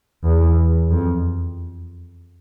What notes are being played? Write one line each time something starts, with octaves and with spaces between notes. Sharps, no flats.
E2
F2